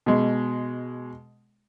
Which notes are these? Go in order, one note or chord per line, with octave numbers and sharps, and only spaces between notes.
B2 G#3